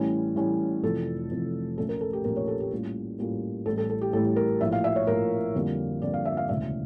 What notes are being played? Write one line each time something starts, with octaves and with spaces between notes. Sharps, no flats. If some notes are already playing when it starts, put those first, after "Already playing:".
Already playing: A1 A2 E3 G3 C#4
A1 A2 E3 G3 C#4
F1 F2 E3 A4
F1 F2 E3
A#1 A#2 A3 C#4 A4
A#4
A4
G4
A#1 A#2 A3 C#4 A#4
C#5
A4
G4
A2 G3 A#3 C#4 F4
A2 G3 A#3 C#4 F4
A1 A2 G3 A4
A4
A4
G4
A1 A2 G3 A4
A#4
A#1 A2 F3 E5
F5
E5
C#5
A#1 A2 F3 A#4
F2 D3 G3 A#3
F2 D3 G3 A#3 D5
F5
E5
F5
E1 D2 C#3 E3 E5